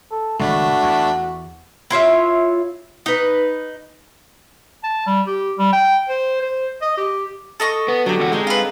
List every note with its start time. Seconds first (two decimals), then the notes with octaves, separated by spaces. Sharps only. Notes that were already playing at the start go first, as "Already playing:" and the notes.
0.11 A4
0.39 G#1 C#2 A3 D4 F#4 B5
0.83 E2
1.90 E4 F4 C#5 E5
3.06 D#4 B4
4.83 A5
5.07 G3
5.27 G4
5.58 G3
5.73 G5
6.09 C5
6.42 C5
6.82 D#5
6.97 G4
7.60 A4 D#5 C#6
7.88 B3
8.06 D3 F#3 G4
8.19 E2 F#4
8.32 G#3 C4 D#4 A4
8.47 F4 B4